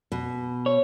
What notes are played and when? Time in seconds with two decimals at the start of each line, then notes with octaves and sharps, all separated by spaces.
0.12 B2
0.66 C#5